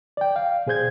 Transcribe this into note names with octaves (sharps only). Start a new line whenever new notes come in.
D5 G5
F5
B2 G#4 C5 G6 G#6